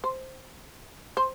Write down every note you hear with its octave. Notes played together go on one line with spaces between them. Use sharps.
C5
C5